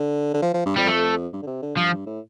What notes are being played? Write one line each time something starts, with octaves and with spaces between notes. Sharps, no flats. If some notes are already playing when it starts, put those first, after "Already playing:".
Already playing: D3
D3
F3
F3
G2
F2 G3
A3
G2
D3
C3
D3
G2 F3
G2
A2